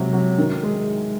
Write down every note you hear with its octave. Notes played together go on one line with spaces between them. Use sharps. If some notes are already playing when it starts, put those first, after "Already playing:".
Already playing: C3 F#3 G#3
F#3
D#3
G#3